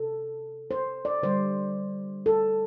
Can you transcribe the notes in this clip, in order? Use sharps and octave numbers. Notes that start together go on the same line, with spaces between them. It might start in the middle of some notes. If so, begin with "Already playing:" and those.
Already playing: C3 A4
C5
D5
D3 G3 C5
A4